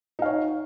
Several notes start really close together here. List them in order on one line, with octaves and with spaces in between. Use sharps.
D#4 F5 C#5